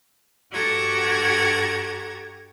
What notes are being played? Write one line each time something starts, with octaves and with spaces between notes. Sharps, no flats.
G2 F#4 G4 A4 A#5 G#6